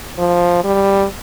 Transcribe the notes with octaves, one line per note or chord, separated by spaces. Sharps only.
F3
G3